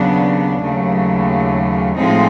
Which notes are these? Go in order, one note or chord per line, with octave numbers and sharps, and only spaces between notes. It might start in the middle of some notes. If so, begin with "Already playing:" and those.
Already playing: D#2 C#3 F#3 B3 D4
D#2 C#3 F#3 A3
A2 F3 G#3 C4 D#4